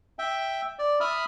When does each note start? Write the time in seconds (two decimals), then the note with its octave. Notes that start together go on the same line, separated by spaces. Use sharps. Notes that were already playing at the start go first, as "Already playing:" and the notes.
0.19 E5 G5
0.79 D5
1.00 E5 B5 D#6 F6